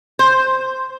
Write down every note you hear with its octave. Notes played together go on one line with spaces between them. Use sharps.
C5